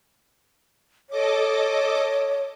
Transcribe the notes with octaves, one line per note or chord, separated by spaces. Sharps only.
A4 C#5 D#5 D6